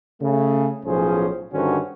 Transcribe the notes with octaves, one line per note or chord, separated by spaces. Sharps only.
C#3 A3
B1 A2 F3 C#4 G#4 C5
G2 D3 D#3 C#4 F#4 C5